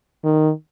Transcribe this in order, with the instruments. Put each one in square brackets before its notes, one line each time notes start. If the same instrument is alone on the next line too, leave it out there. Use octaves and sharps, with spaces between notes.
[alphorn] D#3